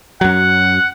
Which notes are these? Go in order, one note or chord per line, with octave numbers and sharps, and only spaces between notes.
F#2 F#3 F#5